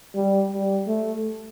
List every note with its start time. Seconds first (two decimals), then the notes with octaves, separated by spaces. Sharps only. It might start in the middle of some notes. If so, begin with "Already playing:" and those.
0.14 G3
0.51 G3
0.87 A3